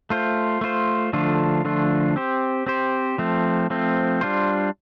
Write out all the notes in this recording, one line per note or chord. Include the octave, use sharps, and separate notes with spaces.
A3 F4 C5
A3 F4 C5
D3 F3 A3 D4 F4
D3 F3 A3 D4 F4
C4 G4 C5
C4 G4 C5
F3 A3 C4
F3 A3 C4
G3 D4 F4 C5